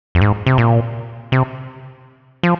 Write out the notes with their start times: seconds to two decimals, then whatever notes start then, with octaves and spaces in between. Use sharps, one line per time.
0.15 F2
0.21 G#2
0.46 C3
0.58 A#2
1.32 C3
2.43 F3